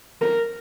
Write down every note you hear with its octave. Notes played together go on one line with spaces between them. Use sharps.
A#4